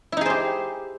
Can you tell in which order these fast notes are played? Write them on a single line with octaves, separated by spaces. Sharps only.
E4 D#4 G#4 C5 G4